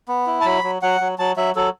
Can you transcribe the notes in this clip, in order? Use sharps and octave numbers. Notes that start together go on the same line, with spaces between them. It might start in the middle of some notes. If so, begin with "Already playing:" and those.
B3
E4
A5
F#3 B5
F#3
F#3 F#5
F#3
F#3 A5
F#3 E5
F#3 A4